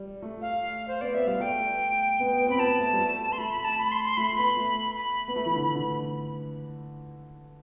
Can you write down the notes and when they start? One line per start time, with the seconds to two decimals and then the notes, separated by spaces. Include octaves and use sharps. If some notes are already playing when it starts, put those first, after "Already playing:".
Already playing: G3
0.22 A3
0.42 F5
0.88 C5
1.01 B3 D5
1.14 B3 E5
1.27 G3 F5
1.40 A3 G5
2.20 B3
2.33 B3
2.47 C4 B5
2.59 B3 A5
2.79 A3
2.93 G3
2.99 A3
3.32 C6
3.38 A3 B5
3.52 B5
3.64 A5
3.78 B5
3.91 C6
4.04 C6
4.17 A3 B5
4.27 C6
4.36 B3 B5
4.57 A3
4.97 B5
5.28 B3
5.36 A3
5.46 E3
5.56 D3
5.75 D3